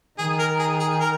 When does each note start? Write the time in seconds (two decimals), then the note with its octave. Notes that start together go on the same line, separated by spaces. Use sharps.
0.18 D#3 G#4
0.39 A#4
0.59 G#4
0.80 G#4
1.00 A#4